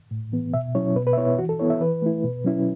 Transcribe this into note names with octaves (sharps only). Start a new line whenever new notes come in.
A2
E3 B3
B2 E5
F#3 C#4 E4 C#5
B2 B4
B4
E5
B3 E4 C#5
E3 F#4
A4
B3 E4 C#5
E5
E3 B4
A3 E4
B2
F#3 C#4 E4